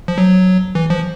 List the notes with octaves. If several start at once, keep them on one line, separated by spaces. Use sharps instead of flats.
F3
F#3
E3
F3